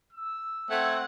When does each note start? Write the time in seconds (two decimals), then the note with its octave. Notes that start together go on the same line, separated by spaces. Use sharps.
0.13 E6
0.70 A3 C4 F#5 G#6